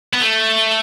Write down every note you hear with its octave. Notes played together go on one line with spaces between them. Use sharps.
B3
A3